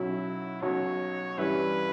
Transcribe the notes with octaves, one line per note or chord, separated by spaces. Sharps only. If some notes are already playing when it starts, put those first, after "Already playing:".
Already playing: B1 B2 F#3 C#4 E4 F#4
B1 B2 F#3 C#4 F#4 C#5
G2 E3 G3 C#4 E4 B4